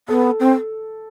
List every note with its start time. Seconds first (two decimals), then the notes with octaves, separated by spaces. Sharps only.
0.08 B3 A4
0.40 C4